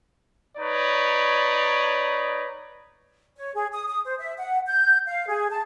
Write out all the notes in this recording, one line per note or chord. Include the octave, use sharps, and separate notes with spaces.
D#4 B4 C#5 D5
C#5
G#4
D#6
D#6
C5
E5
F#5
G6
F5
G#4
A5